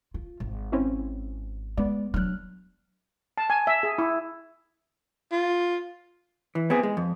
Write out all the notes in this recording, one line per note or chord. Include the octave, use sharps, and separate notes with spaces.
F4
G#1
C4 C#4 E4
G#3 B3 D5
F#3 D4 F6 F#6
A5
G#5
E5
G#4
E4
F4
E3
B3 C4 G#4
G#3
F2